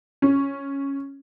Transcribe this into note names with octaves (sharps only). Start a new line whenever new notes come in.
C#4